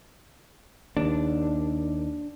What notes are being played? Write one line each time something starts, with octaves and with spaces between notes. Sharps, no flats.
D#2 D4